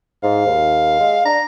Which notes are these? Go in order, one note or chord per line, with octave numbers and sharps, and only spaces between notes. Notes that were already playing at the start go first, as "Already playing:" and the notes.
G#2 F5
D#2
G#3
D4 A#5